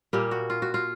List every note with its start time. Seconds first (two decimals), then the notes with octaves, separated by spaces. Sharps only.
0.13 A#2 G3 A#3 G4
0.31 F#4
0.50 F4
0.62 F#4
0.74 F4